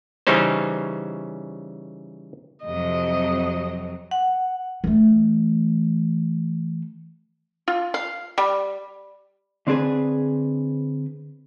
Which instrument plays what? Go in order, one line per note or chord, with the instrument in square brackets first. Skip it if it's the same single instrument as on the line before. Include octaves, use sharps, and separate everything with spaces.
[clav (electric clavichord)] C#3 E3 G3 C#4 D#4 C5
[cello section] F2 C3 F#3 [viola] D#5
[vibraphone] F#5
[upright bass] E3 A3
[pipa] F4
F5
G3
[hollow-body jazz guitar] D3 C4 D4 G#4 B4